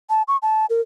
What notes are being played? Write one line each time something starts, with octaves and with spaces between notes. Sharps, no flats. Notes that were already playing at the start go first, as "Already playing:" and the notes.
A5
C#6
A5
A#4